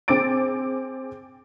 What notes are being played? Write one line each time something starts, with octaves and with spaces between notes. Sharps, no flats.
C4 G#4 D6 A6 D7